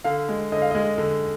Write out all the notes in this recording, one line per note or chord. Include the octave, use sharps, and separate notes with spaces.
D3 F5
G#3
D3 D#5
F5
G#3 D#5
D3